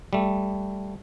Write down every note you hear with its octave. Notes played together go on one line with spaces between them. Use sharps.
G3 A3